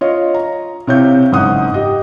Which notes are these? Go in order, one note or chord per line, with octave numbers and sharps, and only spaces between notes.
F4 C#5 D#5
A#5
C3 E4 C#5 F5 G6
F#1 G#2 F#5 D#6 F#6
G4 D#5